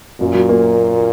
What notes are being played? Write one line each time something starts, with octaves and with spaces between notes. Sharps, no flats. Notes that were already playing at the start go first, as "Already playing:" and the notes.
F#2 A#2
F#3
A#3